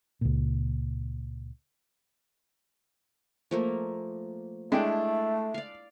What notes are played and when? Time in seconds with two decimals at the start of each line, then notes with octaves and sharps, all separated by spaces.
0.21 C#2 A#2
3.51 F3 A3 A#3
4.72 G#3 A3 D4 E4 E5 G5
5.54 D5 F5